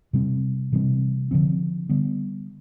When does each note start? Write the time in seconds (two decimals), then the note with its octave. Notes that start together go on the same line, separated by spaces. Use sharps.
0.13 C3 G3 C4
0.72 C3 E3 G3 C4
1.31 D3 F3 C4
1.89 D3 G3 B3